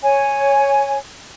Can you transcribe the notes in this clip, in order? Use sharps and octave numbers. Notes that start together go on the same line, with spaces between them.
C#5 G#5